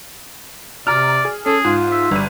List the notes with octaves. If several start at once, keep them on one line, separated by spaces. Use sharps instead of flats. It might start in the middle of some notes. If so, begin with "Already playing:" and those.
C3 D5 A#5 F6
G#4
C#4 G#4 A4
G#2 F4
E5
G1 G3 D#7